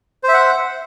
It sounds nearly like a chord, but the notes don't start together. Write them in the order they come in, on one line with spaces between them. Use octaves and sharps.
C5 E5 F#5